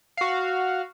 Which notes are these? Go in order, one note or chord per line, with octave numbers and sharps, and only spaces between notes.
F#4 F5